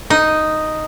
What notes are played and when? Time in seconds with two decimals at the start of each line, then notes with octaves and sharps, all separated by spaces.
0.10 D#4